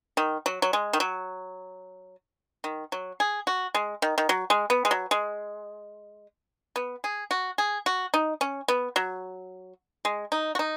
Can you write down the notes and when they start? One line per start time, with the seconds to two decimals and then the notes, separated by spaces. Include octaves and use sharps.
0.17 D#3
0.46 F#3
0.62 F#3
0.73 G#3
0.93 D#3
1.00 F#3
2.64 D#3
2.92 F#3
3.20 G#4
3.47 F#4
3.74 G#3
4.02 D#3
4.18 D#3
4.29 F#3
4.50 G#3
4.70 B3
4.85 G#3
4.91 F#3
5.11 G#3
6.76 B3
7.04 G#4
7.31 F#4
7.58 G#4
7.86 F#4
8.14 D#4
8.41 C#4
8.68 B3
8.96 F#3
10.05 G#3
10.32 D#4
10.55 F#4
10.59 D#4